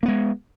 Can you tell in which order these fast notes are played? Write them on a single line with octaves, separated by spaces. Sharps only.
A#3 B3 G#3